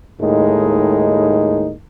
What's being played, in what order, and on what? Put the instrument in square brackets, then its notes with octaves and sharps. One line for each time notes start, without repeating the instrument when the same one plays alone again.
[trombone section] D#2 A2 G#3 D#4